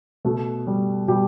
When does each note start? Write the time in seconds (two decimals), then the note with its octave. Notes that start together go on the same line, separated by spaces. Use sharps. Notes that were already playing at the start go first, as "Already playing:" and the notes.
0.25 B2 A3 A4
0.67 G3
1.08 B2 G3 G4